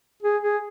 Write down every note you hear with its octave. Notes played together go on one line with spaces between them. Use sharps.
G#4
G#4